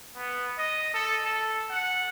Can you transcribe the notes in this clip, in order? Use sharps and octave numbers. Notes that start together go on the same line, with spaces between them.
B3
D#5
A4
A4
F#5